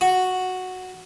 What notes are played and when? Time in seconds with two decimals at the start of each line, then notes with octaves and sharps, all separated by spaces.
0.01 F#4